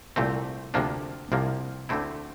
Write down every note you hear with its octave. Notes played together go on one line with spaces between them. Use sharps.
C2 A#2 A3 C4
D2 C3 F3 A#3 D4
C2 C3 F3 A#3
D2 D3 A3 C4 E4